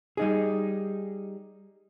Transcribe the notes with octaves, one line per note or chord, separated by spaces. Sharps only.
G3 D#4 G#4